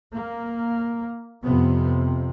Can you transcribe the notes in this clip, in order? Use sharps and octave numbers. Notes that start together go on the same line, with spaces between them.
A#3
F2 C3 B3